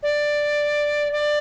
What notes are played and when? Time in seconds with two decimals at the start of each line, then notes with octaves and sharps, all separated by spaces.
0.03 D5
1.13 D5